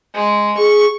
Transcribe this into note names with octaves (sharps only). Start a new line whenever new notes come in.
G#3
G#4 C#6